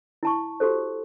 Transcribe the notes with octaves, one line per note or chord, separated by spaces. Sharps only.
E4 A5 C#6
F#4 G4 A4 C5